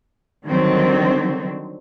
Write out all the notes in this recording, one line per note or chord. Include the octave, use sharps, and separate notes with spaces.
D3 D#3 F#3 G3 C4